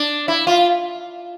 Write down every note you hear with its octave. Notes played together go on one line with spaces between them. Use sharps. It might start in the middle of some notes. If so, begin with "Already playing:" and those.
Already playing: D4
E4
F4